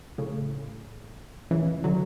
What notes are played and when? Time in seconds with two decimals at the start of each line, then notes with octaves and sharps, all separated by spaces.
0.18 A2 C#3
1.51 C#3 E3
1.84 D3 F#3